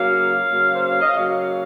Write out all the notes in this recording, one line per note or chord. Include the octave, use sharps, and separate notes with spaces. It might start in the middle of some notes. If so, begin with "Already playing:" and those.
Already playing: C#3 F#3 A#3 C#5 F5
C#3 F#3 A#3
C5
C#5
D#5
C#3 F#3 A#3 C#5 F5